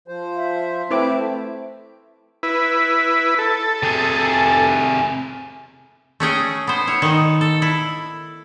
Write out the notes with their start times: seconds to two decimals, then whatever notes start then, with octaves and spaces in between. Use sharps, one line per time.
0.08 F3 C5
0.37 E5
0.91 A3 C4 E4 B4 D6
2.43 E4 B4
3.39 A4
3.83 C3 G#4
6.20 A3 C#4 G#4 G5
6.67 B3 C5
6.87 E4 C#5
7.02 D#3 D#4
7.41 A4
7.62 E4